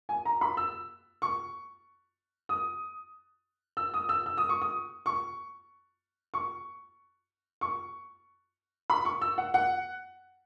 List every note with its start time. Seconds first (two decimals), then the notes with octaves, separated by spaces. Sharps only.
0.09 G#5
0.25 A#5
0.41 B5
0.57 E6
1.22 C#6
2.49 D#6
3.77 E6
3.94 D#6
4.09 E6
4.26 E6
4.38 D#6
4.49 C#6
4.62 D#6
5.06 C#6
6.34 C#6
7.61 C#6
8.90 B5
9.05 C#6
9.21 E6
9.38 F#5
9.54 F#5